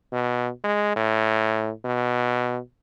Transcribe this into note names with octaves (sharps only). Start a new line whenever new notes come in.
B2
G#3
A2
B2